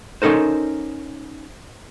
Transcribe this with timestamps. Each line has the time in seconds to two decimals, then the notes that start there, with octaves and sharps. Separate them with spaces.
0.22 C#4 D#4 A4 A#4 C5